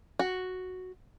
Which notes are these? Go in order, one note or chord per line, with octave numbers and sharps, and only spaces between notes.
F#4